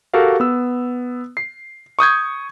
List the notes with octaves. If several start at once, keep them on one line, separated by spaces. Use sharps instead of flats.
F#4 G4 A4 A#4 F5
B3 E6
C7
C#6 D#6 G6 G#6